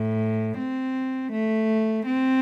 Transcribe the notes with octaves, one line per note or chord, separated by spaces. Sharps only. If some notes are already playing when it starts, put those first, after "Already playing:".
Already playing: A2
C4
A3
C4